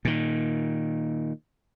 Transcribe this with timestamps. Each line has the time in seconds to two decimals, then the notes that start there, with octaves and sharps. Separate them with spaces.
0.05 A#2 D#3